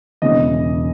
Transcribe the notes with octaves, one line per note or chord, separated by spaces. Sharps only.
E1 E2 C#3 E3 D#5